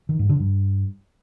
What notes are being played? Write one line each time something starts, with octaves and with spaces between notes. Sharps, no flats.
D#3
G#2
D3
G2